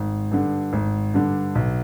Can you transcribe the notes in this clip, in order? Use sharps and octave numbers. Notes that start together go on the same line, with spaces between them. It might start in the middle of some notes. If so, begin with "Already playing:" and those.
Already playing: G#1
G2 D3
G#1
G2 D3
B1